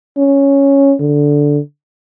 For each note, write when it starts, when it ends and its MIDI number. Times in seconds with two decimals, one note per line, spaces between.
0.17 0.94 61
1.00 1.59 50